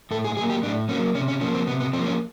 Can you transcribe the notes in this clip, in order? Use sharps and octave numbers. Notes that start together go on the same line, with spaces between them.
A2 A4
G#4
F#3 A#3 G#4
G4
A2 D4
F#3 A#3 C#4
C3 C#4
C#4
F3 A#3 C#4
C4
C3 B3
B3
F3 A#3 C4
C#4